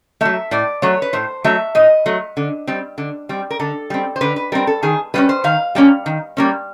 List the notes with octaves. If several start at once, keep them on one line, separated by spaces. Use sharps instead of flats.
F#3 A3 E5
A2 D5
F#3 A3 C#5
B4
A2 C5
F#3 A3 E5
A2 D#5
F#3 A3
D3
G3 C4
D3
G3 C4
A#4
D3 A4
G3 C4
C5
D3 B4
B4
G3 C4 A#4
A4
D#3 G#4
G3 A#3 C#4 B4
C5
D#3 F5
G3 A#3 C#4
D#3
G3 A#3 C#4